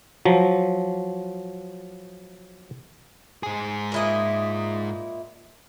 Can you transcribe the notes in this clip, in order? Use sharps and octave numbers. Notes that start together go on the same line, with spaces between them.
F3 F#3
G#2 G#4
A#2 E4 D#5